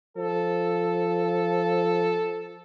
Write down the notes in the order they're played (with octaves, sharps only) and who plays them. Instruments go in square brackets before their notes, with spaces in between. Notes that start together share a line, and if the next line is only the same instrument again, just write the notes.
[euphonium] F3 [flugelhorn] A4